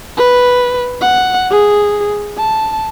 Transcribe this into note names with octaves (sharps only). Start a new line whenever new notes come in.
B4
F#5
G#4
A5